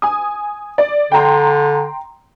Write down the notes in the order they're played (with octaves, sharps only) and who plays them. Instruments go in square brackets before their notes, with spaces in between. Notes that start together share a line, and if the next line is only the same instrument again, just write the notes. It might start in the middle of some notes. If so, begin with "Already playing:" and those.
[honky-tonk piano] G#5 D#6
D5
[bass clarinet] D3 [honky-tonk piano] G5 A#5 C6